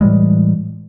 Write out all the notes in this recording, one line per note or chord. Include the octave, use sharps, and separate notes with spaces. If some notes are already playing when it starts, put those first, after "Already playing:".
A2 E3 G3 G#3